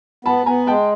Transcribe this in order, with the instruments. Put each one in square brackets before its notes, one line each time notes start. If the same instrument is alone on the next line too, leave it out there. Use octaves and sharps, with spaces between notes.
[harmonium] B3 [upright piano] A5 B5
[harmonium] B3 [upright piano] G#5 A#5
[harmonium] G#3 [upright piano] G5 A5